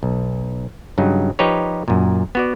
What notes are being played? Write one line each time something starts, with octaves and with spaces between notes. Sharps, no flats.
B1
G2 C#3 F#3 D#4
F3 D#4 G4 B4 C#5
F#2 A#2
B3 F#4 D5